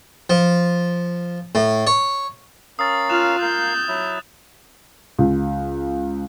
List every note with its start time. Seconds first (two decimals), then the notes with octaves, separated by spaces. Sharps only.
0.30 F3
1.55 A2
1.87 C#5
2.79 C#4 A#4 F5 D#6 E6 A6
3.09 F4 F6 F#6 E7 F7
3.42 A#4 F5 G6
3.88 F#3 E4 E5
5.19 C#2